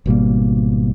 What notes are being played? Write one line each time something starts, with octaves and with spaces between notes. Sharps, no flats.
G#1 B2 G3 A#3